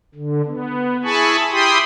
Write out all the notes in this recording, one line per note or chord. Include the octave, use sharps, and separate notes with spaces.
D3
B3
E4 G#4 G#5 A5 B5 C#6
E4 G4 G5 B5 C6 D#6